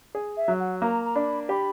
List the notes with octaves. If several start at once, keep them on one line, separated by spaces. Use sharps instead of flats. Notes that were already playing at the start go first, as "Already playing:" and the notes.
G#4
E5
F#3
F#5
A#3 A#5
A#5
D4 B5
G4 B5